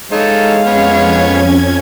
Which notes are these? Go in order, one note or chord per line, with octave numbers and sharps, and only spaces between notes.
G#3 D#4 A4 C#5 F5
F2 B3 C#4 C#5 G#6